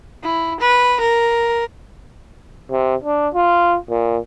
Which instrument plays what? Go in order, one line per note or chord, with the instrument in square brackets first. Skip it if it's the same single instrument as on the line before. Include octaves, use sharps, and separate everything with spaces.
[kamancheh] E4
B4
A#4
[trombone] C3
D4
F4
A#2